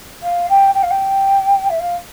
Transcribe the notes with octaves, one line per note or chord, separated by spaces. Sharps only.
F5
G5
G5
F5
G5
E5
F5